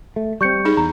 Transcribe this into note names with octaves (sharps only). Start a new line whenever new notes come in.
A3
G3 C4 C#6 G6 C#7
D#4 G#4
E2 A#5